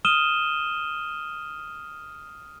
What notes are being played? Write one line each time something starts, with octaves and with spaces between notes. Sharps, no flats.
D#6 F6 D#7 E7 G7